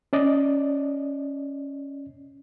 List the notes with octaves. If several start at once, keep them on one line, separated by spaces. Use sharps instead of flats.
C#4 D5 D#5